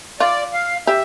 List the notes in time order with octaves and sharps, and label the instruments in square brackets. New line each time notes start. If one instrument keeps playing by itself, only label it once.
[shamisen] F4 [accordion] D5
[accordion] F5
[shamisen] G4 [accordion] E5